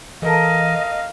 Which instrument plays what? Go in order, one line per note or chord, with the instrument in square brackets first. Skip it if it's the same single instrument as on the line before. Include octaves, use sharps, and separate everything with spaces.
[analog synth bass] E3 [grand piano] A4 A#4 A5 [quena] D#5 [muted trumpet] F5